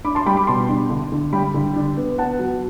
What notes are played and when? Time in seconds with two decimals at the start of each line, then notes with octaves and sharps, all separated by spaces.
0.04 D4 B5 D6
0.15 A5 C6
0.26 G3 G5 B5
0.37 B5 D6
0.47 B2 A5 C6
0.69 D4
0.90 D3
1.12 D3
1.33 G3 G5 B5
1.54 D3
1.76 D4
1.97 B3
2.18 B3 F#5 A5
2.39 F#3